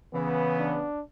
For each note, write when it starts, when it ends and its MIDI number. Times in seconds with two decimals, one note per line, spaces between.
0.14 0.86 49
0.14 0.79 52
0.14 0.86 59
0.59 1.01 62